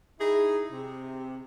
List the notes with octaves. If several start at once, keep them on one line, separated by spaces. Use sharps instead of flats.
D#4 E4 G#4
C3